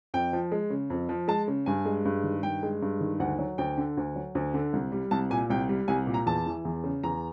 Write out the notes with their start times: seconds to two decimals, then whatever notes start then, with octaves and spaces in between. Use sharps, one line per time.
0.14 F2 G5
0.33 F3
0.52 G#3
0.70 C#3
0.90 F2
1.09 F3
1.28 G#3 A5
1.48 C#3
1.66 G2 G#5
1.85 G#3
2.05 G2
2.24 D#3
2.43 G2 G5
2.63 G#3
2.82 G2
3.01 D#3
3.20 D2 F#5
3.39 F#3
3.58 D2 G5
3.77 D3
3.97 D2
4.16 F#3
4.35 D2
4.54 D3
4.73 C2
4.92 G3
5.11 C2 A5
5.30 A#2 G#5
5.50 C2 G5
5.69 G3
5.88 C2 G#5
6.07 A#2
6.14 A#5
6.26 E2 A5
6.46 E3
6.65 E2
6.84 C#3
7.03 E2 A#5